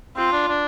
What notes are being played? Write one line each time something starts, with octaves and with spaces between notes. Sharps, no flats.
C4 F4
D4
D4